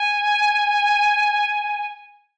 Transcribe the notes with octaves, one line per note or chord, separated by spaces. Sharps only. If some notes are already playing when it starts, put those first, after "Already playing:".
Already playing: G#5